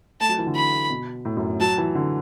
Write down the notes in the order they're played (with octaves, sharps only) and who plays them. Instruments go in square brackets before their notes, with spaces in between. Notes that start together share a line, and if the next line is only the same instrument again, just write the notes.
[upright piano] A3 [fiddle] A5
[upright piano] F#3
E3
D3
[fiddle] B5
[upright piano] B2
A2
F#2
[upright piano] F#3 [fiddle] A5
[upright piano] E3
D3